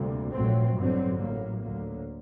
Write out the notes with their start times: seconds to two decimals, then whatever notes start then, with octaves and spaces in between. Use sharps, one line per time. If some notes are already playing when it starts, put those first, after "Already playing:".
Already playing: D2 C3 G3 A#3
0.33 A#1 A#2 F#3 A3 C4
0.76 A1 G2 D3 F#3 C4
1.19 A1 A2 F#3 A#3
1.61 D2 D3 F#3 A#3